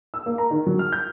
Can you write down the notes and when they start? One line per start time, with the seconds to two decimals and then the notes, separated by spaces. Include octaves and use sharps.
0.14 E6
0.26 A#3
0.38 A#5
0.51 D#3
0.66 F#3
0.79 F6
0.92 G6